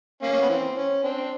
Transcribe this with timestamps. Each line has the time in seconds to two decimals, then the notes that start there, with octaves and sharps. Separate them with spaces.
0.23 A#3 C#4
0.33 A#3
0.42 B3
0.49 E3 C4
0.76 C#4
1.03 C4 D4